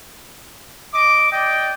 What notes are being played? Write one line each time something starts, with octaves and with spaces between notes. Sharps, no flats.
D#5 D6
D5 D#5 G5